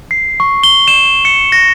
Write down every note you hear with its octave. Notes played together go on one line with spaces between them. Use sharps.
C7
C#6
G7
E7
C#7
A#6